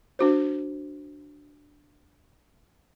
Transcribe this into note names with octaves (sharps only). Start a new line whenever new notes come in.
D4 F#4 C5